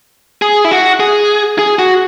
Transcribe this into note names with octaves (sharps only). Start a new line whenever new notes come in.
G#4
E4
F#4
G#4
G#4
F#4